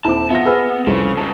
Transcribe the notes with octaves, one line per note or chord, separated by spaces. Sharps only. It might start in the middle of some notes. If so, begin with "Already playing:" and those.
D#1 C4 E4 A5 D6
E2 B3 F4 E5 A#6
G#4 B4 E5 E6 F6
C2 F2 C#3
G#2 C#3 A5